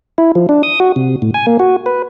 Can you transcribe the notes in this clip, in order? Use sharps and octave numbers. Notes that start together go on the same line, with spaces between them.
E4
F3
D4
D#6
F#4
C3
A2
G#5
A#3
F#4
B4